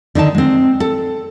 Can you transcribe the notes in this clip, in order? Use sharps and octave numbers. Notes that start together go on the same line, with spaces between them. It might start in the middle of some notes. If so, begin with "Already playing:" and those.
D3 D#3 D#4 A5
G#3 C4
A4